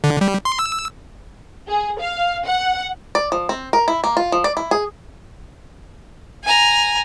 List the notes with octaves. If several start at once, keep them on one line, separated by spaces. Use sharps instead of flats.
D3
G3
C6
E6
G#4
F5
F#5
D5
F3
C4
A#4
E4
A#3
F4
F3
D5
E4
G#4
G#5 A#5